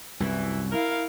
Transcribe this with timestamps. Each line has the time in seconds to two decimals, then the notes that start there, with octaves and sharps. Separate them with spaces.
0.20 C2 F#2 E3
0.72 E4 A#4 F5